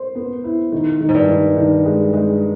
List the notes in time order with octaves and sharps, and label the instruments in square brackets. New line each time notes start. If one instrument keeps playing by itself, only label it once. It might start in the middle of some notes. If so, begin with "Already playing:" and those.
Already playing: [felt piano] C5
B3
E4
D#3
D#3
[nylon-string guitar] G#2
G2
[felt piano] D#3
D#3
G#3
G#3